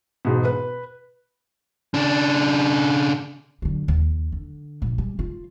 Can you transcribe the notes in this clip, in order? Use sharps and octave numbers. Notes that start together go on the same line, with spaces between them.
E1 G#2 B2
B4
C#3 D4
D3 F#3
D#2
D3
A#1
G3
F4